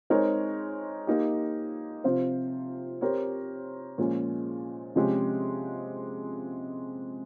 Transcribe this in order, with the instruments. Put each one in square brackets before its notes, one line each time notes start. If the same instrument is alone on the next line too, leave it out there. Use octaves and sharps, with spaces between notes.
[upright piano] G#3 C4 D#4 A#4 C#5
A#3 D#4 G4
C3 F3 C4 F4 C5
C4 G4 A#4 C#5
A#2 F3 G#3 C#4
C3 F3 G#3 C#4 G4